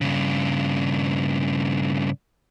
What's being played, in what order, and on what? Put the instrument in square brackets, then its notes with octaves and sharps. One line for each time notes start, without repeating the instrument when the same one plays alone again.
[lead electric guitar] G2 C#3